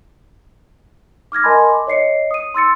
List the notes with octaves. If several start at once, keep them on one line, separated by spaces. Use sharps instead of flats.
D6 F6 G#6 A#6
A#4 D#5 G#5 A5 B5 C6
D6
C#5 D#5 C7 C#7
D#6 D#7
C6 E6 A6 C#7